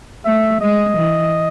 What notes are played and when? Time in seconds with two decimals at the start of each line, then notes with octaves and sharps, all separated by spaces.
0.25 A3 E5
0.61 G#3 D#5
0.97 E3